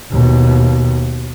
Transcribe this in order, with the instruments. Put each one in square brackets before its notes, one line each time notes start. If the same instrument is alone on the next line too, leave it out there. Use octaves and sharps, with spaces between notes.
[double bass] D#2 B2